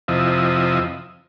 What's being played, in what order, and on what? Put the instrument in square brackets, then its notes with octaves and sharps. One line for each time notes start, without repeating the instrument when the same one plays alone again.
[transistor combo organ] F2 C3 F3 E4 D#5